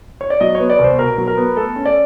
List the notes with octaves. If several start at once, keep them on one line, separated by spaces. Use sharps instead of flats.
C#5
D5
F#3 D#5
B3 C#5
D5
C2
C5
B2 A#4
F#3
A#4
B3
A3 A4
C#4
D5